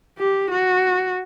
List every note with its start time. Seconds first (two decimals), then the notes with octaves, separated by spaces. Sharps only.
0.19 G4
0.50 F#4